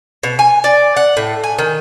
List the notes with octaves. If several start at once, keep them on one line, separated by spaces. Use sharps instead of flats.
B2
G#5
D5
F#5
A2
G#5
D#3